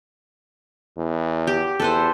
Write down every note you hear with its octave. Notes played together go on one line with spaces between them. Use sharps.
E2
G4
E2 A4 B4 C5